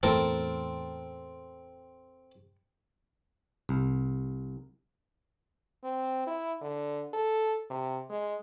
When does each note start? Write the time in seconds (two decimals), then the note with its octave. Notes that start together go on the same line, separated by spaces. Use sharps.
0.03 E2 A2 C4 A4 A#4
3.69 C2
5.84 C4
6.27 E4
6.61 D3
7.14 A4
7.70 C3
8.10 G#3